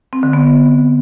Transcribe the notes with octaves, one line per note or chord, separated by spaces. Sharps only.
C4
D3
B3